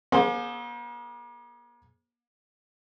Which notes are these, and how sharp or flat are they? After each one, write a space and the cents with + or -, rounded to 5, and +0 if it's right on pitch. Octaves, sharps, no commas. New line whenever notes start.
A#3 +45 G#4 +30 C5 +15